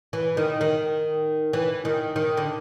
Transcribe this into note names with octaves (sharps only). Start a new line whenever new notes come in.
E3
D#3
D#3
E3
D#3
D#3
D3